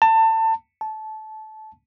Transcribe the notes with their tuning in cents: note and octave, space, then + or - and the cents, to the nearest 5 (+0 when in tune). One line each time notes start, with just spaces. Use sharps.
A5 +25
A5 -20